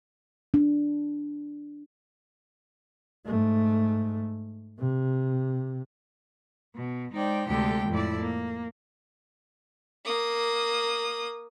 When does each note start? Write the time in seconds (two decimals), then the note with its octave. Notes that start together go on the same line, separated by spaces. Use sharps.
0.54 D4
3.26 G#2 A3
4.79 C3
6.75 B2
7.12 G#3 D#4 C5 D5 G5
7.48 D2 C3 G#3 G4 A4 G5
7.90 F2 A2 E4 D5
8.21 A#3
10.05 A#3 D#6